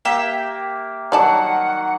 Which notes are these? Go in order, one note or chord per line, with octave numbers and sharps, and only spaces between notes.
A#3 G4 E5 G5
D#3 F#3 G3 D5 F#5 A5